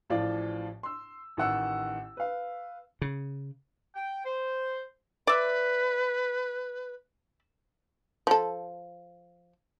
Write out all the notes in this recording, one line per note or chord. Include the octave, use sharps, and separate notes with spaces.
A1 A2 F3 F4 D5
C6 E6
A1 D#3 F#5 E6
B4 F5
C#3
G5
C5
B4 D5 E5
F3 A4